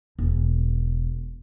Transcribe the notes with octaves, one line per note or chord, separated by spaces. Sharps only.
E1